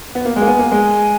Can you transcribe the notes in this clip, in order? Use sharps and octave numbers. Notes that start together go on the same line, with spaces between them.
B3
A#3
G#3 G#5
A#3
B3
A#3
G#3